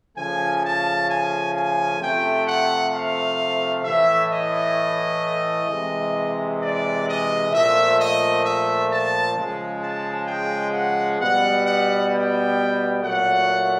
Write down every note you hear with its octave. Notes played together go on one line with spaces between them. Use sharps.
C#3 F3 A3 G#5
A5
G#5
G#5
C3 F3 A3 G5
F#5
F5
A2 E3 A3 E5
D#5
C3 E3 G#3
D5
D#5
A#2 F3 A3 E5
D#5
E5
A5
C#3 F3 G#3
A5
G5
F#5
B2 G3 B3 F#5
F#5
G5
A#2 F#3 A3 F#5